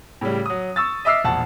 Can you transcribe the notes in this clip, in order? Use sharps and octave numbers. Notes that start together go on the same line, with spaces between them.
A2 C#3 G3
F#3 D#6
C#6 E6 A6
D#5 E5 D6 E6 F6 C7
E1 A#1 F#5 A5